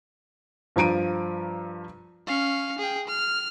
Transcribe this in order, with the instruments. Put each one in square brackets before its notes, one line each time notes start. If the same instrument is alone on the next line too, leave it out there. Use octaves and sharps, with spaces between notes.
[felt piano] G2 F3 A#5 D7 D#7
[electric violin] C#4 F5
G#4 G5
F6